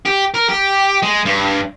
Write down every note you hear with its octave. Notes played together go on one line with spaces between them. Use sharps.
G4
A#4
G4
G#3
G2